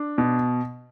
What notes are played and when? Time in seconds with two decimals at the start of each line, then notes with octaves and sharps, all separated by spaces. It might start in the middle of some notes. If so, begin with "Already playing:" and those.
Already playing: D4
0.18 B2